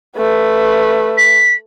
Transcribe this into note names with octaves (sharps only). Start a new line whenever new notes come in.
A3 B4
B6